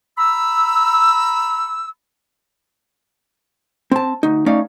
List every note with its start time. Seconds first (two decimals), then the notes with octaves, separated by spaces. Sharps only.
0.18 A#5 B5 E6
3.91 C4 A5
4.23 D2 D#4
4.46 A3 C#4 D#4 D5 F5